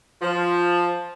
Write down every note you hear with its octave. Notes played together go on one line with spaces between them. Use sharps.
F3